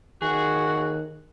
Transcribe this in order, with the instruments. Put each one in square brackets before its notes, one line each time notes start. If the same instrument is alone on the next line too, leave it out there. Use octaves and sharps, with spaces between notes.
[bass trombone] D#3 [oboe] F#4 [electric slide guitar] G#4